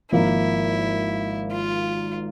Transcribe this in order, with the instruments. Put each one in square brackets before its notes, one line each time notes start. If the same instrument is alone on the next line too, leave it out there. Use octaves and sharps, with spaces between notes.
[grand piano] G#1 G#2 F3 A#3 [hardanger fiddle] E4
[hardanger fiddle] F4